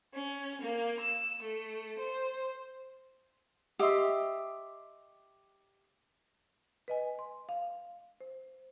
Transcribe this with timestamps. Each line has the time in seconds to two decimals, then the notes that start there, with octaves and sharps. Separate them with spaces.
0.14 C#4
0.61 A#3
1.00 E6
1.43 A3
1.99 C5
3.79 G4 D#5 E5 C6
6.88 B4 D#5 G#5
7.19 C6
7.49 F5
8.20 C5